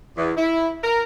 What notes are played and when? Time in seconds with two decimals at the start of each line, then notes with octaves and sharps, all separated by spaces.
0.17 E2
0.37 E4
0.84 A#4